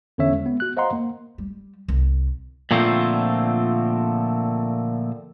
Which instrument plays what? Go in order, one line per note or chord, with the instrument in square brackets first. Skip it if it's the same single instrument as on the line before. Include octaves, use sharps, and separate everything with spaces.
[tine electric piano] E2 D3 C#4 C#5 E5
G#3
B3
F#4 F#6
C5 D#5 F5 F#5 A#5 C6
A#3
[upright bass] G3
C2
[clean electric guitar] A#2 D3 F3 A3 C4 C5